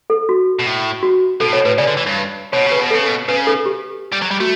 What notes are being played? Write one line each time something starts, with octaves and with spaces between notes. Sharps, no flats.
A4
F#4
B2
A2
F#4
B2 A4
A2
B2 C#5
A2 B4
C#3 D5
D3
E3
G2
B2 C#5
C#3
B4
B2
C#3 A4
B2
C#3 B4
A4
G4
G3
F#3
G3
A3 F#4